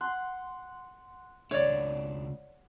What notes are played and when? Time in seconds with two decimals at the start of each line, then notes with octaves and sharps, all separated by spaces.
0.01 F#5 C6
1.51 C#2 D4 C#5 D5